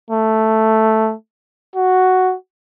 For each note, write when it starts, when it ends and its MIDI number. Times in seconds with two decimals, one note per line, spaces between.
0.10 1.14 57
1.76 2.35 66